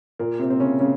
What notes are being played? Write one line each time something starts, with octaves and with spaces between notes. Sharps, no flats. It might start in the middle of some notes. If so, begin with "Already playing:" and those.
A#2 A#3
C3 C4
C4
C#3 C#4
C#3 C#4